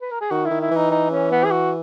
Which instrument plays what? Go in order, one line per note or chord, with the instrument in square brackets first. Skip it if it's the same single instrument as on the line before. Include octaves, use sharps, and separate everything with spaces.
[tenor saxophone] B4
A#4
G#4
[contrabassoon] D#3 [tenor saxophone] F#4
[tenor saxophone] E4
[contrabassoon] D#3
[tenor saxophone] E4
[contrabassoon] E3 [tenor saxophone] D#4
[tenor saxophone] D#4
C#4
B3
G#4
F#4